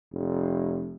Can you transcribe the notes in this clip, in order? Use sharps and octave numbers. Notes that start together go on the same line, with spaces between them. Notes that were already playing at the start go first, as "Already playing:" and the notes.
F1